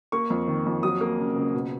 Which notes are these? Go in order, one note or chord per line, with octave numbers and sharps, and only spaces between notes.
A#3 C#6
F2
D#3
F2
F#3 D#6
A#3
C#3
C#2
B2